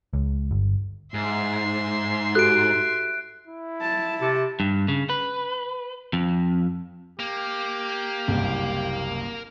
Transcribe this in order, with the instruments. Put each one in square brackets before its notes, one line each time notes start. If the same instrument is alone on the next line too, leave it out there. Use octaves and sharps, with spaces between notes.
[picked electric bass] C#2
G1
[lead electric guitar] G#2 [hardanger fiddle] E5 C6
[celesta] F#4 G4 A4 [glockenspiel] F#6 D7
[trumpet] E4
[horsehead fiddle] A5
[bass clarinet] C3
[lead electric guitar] G2
C#3
B4
F2
[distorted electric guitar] A#3 [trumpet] G4
[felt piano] F#1 C2